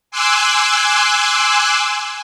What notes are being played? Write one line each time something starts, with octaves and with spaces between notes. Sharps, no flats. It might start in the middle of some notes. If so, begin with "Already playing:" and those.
G#5 C6 D6 E6 F#6